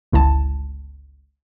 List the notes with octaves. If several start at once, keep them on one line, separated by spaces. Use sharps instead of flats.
G1 C#2 E4 A5